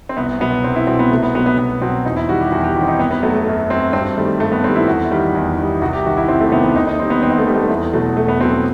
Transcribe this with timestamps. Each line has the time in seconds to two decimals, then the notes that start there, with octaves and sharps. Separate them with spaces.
0.09 C4
0.17 C2 B3
0.40 B2 F#3 B3
0.64 C2 C4
0.76 E4
0.87 B2 F#3 C4
0.99 B3
1.11 C2 A3
1.23 B3
1.35 F#3 B3
1.39 B2
1.46 B3
1.58 C2 B3
1.82 B2 F#3 C4
2.05 E2 D#4
2.16 E4
2.29 D#3 G3 F#4
2.40 G4
2.52 E2 F#4
2.64 G4
2.76 D#3 F#4
2.80 G3 C4
2.88 D#4
2.99 F#2 B3
3.11 B3
3.23 F#3 A3
3.34 A3
3.47 F#2
3.70 F#3 C4
3.93 G2 C4
4.17 D#3 G3 A3
4.40 G2 A3
4.52 B3
4.64 D#3 C4
4.68 G3
4.76 E4
4.87 E2 F#4
5.11 D#3 G3
5.35 E2
5.58 D#3 G3
5.81 C2 F#4
5.93 G4
6.05 C3 D#3 F#4
6.17 E4
6.28 C2 C4
6.40 A3
6.52 C3 D#3 B3
6.64 B3
6.75 D#2 D#4
6.87 D#4
6.99 D#3 C4
7.02 G3
7.10 B3
7.23 D#2 C4
7.31 B3
7.38 A3
7.46 D#3 G3
7.54 A3
7.70 E2 B3
7.93 B2 F#3 A3
8.17 E2 A3
8.28 B3
8.41 B2 F#3 C4
8.52 B3